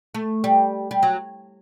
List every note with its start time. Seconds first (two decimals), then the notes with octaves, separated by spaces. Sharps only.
0.14 A3
0.44 G3
0.91 G3
1.03 F#3